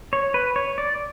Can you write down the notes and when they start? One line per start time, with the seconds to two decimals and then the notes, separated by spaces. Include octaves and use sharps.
0.13 C#5
0.34 B4
0.56 C#5
0.78 D5